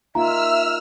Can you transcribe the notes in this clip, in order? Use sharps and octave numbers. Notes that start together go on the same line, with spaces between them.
A#3 D#4 F4 E5 A#5 E6 F6